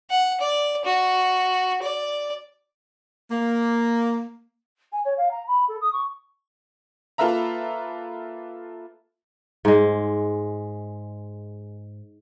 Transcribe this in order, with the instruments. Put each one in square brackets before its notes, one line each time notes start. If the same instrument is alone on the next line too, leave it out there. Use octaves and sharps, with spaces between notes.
[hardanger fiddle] F#5
D5
F#4
D5
[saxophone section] A#3
[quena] G#5
C#5
F5
A#5
B5
A4
D#6
C#6
[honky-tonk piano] A#3 F4 A4 B4 E5 A#5
[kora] G#2 G#3